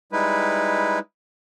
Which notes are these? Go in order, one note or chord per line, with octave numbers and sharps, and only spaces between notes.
G3 G#3 D#4 E4 B4